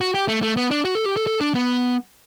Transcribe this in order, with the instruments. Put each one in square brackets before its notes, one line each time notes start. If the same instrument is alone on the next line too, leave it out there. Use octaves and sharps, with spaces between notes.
[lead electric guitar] F#4
G4
A3
A3
B3
D4
F#4
A4
G4
A4
A4
D4
B3